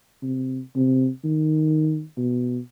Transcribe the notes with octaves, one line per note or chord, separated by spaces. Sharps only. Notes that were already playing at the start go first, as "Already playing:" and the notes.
C3
C3
D#3
B2